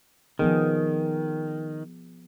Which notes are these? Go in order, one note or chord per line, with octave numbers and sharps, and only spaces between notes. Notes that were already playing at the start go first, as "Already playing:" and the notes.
D#3 F3 B3 G#4